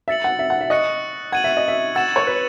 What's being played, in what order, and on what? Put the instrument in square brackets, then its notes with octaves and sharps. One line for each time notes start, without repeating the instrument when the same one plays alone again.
[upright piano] E5 [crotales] E6 A6 C#7 F#7
[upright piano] F#5
E5
F#5
E5
[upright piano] D#5 [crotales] C#6 F#6 C#7
[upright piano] F#5 [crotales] G#6 D#7 F#7
[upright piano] E5
D#5
E5
[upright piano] F#5 [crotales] E6 A6 E7
[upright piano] C#5
B4